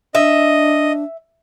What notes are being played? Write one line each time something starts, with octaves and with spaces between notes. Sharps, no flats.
D4 D#5 E5